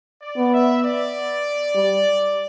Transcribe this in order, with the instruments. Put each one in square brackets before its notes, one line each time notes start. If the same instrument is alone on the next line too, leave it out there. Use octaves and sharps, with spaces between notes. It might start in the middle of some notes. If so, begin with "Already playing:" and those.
[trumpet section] D5
[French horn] B3
[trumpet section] E5
D5
[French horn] G3